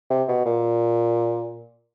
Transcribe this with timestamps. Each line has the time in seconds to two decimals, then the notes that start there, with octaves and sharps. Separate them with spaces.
0.10 C3
0.28 B2
0.46 A#2